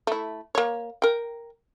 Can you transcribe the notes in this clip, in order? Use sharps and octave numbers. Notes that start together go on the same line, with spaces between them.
A3 E4
A#3 C#5
A#4 G5